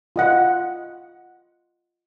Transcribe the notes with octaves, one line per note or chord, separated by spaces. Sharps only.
F4 D#5 F#5